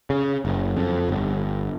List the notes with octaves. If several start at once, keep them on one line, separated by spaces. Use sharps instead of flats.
C#3
F#1
F2
G1